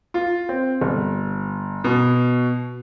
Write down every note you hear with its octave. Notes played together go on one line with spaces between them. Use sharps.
F4
C4
G1
B2